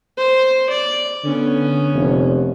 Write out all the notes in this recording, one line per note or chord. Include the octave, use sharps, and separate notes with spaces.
C5
D5
D3 B3 C#4
F1